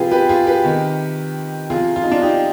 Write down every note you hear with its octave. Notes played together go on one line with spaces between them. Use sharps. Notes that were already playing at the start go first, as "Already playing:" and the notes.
Already playing: C3 F3 F4 G4 G#4 B4
G4 B4
F4 G#4
G4 B4
C3 D#3
C3 F3 F4 G#4
F4
D#4
D4 F4
D#4 G4